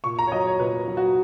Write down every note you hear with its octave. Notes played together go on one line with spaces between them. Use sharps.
A#2 C#6
A#5
C#5
F#3 D#5
C#5
A#2 B4
F#3
F#4